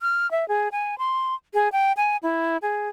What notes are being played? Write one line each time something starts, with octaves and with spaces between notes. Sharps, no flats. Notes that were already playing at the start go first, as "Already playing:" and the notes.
F6
E5
G#4
G#5
C6
G#4
G5
G#5
E4
G#4